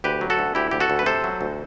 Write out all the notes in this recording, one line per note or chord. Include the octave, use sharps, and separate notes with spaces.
D2 G4 B4
F#3
F#4 A4
D2
D2 E4 G4
D2 G4
F#4 A4
D2
B4
C3 A4 C5
F#3
D2